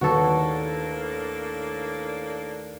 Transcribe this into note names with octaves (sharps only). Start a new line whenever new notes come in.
D#2 A2 A#3 D4 F#4 A4 B4